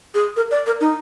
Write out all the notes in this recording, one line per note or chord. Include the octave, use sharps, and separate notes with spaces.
G#4
A#4
D5
A#4
D#4